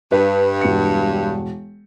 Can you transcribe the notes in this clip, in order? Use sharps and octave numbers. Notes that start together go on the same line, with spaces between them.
G2 B4
E1 C#7